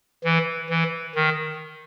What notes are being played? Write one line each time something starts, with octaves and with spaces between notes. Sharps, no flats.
E3
E3
D#3